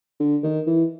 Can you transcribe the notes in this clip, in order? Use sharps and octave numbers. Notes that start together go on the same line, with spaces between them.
D3
D#3
E3